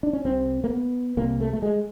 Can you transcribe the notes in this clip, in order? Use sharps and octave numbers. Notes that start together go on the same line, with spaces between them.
D4
C#4
C2 C3 C4
A#3
B3
C2 C3 A#3
A3
A3
G#3